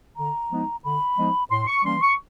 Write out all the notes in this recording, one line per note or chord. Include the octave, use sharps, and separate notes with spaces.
D3 A#5
F3 G#3 B3 D#4
D3 B5
F3 G#3 B3 D#4
A2 C6
C#6
E3 G3 A#3 C#4 C6
C#6